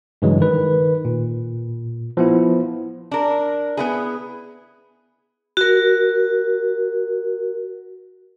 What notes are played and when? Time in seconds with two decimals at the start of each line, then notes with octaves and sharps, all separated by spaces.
0.22 G2 C#3 E3 F#3 G#3
0.40 D#3 B4
1.05 A#2
2.17 F3 B3 E4
3.11 D4 A#4
3.77 B3 E4 G#4
5.57 F#4 A#4